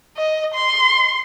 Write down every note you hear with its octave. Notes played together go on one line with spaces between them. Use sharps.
D#5
C6